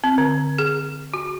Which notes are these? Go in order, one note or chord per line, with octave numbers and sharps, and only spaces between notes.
C4
D3
G#4
F#4